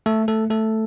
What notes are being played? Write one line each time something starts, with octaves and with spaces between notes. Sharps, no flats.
A3 A4
A3 A4
A3 A4